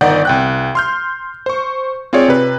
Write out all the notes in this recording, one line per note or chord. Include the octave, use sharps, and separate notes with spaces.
G1 D#3 D#4 D5 F#5 G6
C2 G5 F#6
C6 F6 G6
C5 C#6
C4 F4 G#4 C#5 D5
C3 B4